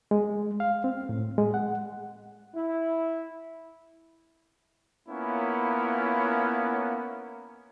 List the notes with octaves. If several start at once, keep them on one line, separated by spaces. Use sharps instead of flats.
G#3
F5
C4
A2
G#3
F#5
E4
A#3 B3 C#4 E4 F4 C#5